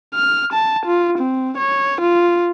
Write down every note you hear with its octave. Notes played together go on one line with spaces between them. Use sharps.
F6
A5
F4
C4
C#5
F4